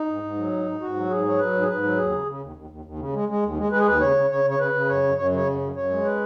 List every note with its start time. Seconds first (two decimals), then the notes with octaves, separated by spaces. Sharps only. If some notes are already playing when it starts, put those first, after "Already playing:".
Already playing: D#4
0.09 G#2
0.23 G#2
0.37 F#3
0.52 G#2
0.66 G#2
0.81 G#2 F#4
0.96 F#3
1.10 G#2 G#4
1.25 F#3 C#5
1.39 F#3 B4
1.53 G#2
1.61 G#4
1.68 G#2 B4
1.83 F#3
1.97 D#2 G#4
2.12 C#3
2.26 C#3
2.41 D#2
2.56 D#2
2.70 D#2
2.85 D#2
2.99 C#3
3.13 G#3
3.29 G#3
3.43 D#2
3.57 G#3
3.72 G#3 B4
3.79 G#4
3.86 D#2 B4
4.01 C#3 C#5
4.16 C#3
4.30 C#3 C#5
4.44 C#3
4.50 C#5
4.59 C#3 B4
4.74 C#3
4.88 F#2 C#5
5.03 F#2
5.17 F#2 C#5
5.32 C#3 C#5
5.47 F#2
5.61 F#2
5.76 F#2 C#5
5.90 G#3
6.05 B4